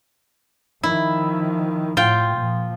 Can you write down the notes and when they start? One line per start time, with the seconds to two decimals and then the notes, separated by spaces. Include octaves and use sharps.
0.83 D#3 F3 E4
1.97 A2 F4 G5
2.34 A#2 F3